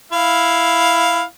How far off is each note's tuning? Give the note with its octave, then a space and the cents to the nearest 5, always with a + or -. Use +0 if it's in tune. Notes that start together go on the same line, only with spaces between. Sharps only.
E4 +5 F5 +0